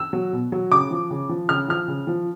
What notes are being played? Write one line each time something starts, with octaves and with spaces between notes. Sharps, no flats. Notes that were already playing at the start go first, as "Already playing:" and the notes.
Already playing: E6
F#3
B2
F#3
C#3 D6
F3
C#3
F3
C#3 F6
F3 F6
C#3
F3